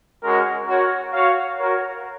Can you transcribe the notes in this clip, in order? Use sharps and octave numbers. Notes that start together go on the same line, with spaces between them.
G#3 C#4 F#4 A#4
F#4 A#4 C#5
F#4 C#5 F5
F#4 A#4 C#5